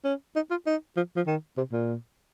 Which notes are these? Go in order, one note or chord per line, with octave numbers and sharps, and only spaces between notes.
C#4
D#4
F4
D#4
F3
F3
D#3
C3
A#2